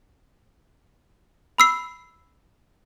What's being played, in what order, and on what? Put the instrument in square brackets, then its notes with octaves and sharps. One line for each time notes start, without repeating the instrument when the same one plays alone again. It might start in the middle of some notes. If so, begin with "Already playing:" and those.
[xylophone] B5 E6 C7